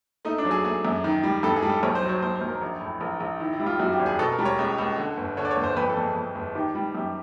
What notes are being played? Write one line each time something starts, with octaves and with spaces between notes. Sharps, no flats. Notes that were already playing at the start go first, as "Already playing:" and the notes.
A3 D#4
D4
F#3
G#4
A3 G#4
F#2
D#3
G3
G2 A4
G#4
G3
A4
B1 C#5
C5
F#3
C#5
B1 C5
C5
B1
A#4
A#1
A2
A#1 A#4
A#1
D#3 E4
E4
G3
F4
F#2 F#4
G4
G#1
G#4
B2 A4
A#4
G3
C#5
C#2
C#2
D3
G1
D3 C#5
D5
C#5
G1
C5
F2 B4
A4
F2
G#4
F2
G1
D#3 G4
G3
F#2 G4